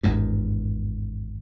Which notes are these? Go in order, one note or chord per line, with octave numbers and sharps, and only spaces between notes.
G#1 E2 G2